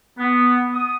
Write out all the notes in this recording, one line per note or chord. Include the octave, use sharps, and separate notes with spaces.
B3
D#6